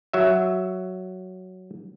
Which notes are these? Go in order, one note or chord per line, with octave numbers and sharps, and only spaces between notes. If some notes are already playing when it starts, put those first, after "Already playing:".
F#3 E5